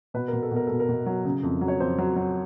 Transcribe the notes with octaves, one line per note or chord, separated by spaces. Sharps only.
B2 B4
A#4
B2
A4
B2 A#4
B2 A4
A#4
B2
F#3
C#3
F2
F#3
C#5
F2 C5
F#3
F#3